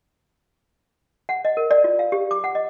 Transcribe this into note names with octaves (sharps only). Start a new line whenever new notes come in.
F#5
D#5
A#4
D5
F4
F5
G4
D6
F#5
D#5